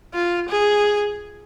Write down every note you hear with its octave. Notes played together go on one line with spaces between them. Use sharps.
F4
G#4